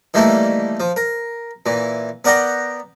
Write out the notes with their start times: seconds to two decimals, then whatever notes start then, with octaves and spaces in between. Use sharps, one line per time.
0.14 D#3 E3 G3 A3 A#3 E4
0.80 F3
0.97 A#4
1.66 A#2 E3
2.25 B3 A#4 D5 F#5 G5 A#5